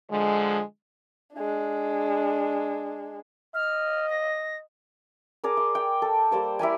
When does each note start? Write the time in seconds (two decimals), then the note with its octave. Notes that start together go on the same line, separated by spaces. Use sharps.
0.10 D3 F3 G#3
1.34 G#3 D4
3.54 D#5 F6
4.10 A#6
5.44 G#4 A#4 D5
5.57 C6
5.75 G5
6.02 A4
6.31 G3 A#3 C5 D6
6.59 E4 G4 A#4 G#5